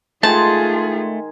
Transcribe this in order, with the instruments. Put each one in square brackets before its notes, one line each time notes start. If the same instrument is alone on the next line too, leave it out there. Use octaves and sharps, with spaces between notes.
[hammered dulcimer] D#3 G#3 G#5 [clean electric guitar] A3 [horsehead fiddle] F4 G#4 [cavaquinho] A5